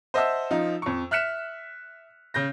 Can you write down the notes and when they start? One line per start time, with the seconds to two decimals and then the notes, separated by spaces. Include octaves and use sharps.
0.14 C5 D#5 E5 F#5 A5 E6
0.51 F3 D#4 F4
0.82 F2 C#6
1.11 E5 F6 F#6 B6 C#7 E7
2.34 C#3 G6 A#6